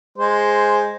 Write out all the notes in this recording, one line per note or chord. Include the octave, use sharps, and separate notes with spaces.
G#3 C5